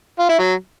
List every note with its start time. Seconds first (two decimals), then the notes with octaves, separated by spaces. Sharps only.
0.19 F4
0.29 E4
0.39 F#3